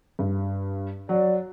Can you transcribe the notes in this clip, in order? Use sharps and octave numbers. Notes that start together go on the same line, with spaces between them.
G2
F#3 D5